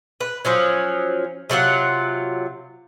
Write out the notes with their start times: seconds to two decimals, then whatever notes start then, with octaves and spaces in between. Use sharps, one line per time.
0.20 B4
0.45 F3 F#3 C#4
1.50 C3 F#3 F4 F#5